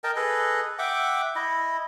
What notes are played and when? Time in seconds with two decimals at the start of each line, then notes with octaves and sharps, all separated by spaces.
0.04 A#4 D#5 G5 A5
0.16 G#4 A4 B4 D#5
0.79 E5 F#5 G5 D6
1.36 E4 D#5